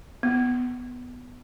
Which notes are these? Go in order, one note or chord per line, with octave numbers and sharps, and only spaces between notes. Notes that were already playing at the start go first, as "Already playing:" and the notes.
B3